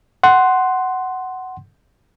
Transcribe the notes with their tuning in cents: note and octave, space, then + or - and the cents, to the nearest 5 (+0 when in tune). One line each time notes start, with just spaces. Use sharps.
F#5 +10 C6 +0